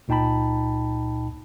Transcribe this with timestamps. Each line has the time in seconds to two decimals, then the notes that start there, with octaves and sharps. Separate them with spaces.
0.08 C#2 A#2 D#4 G5 A5 B5